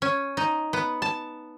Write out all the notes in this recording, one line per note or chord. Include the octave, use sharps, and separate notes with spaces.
C#4
D#4
B3
A5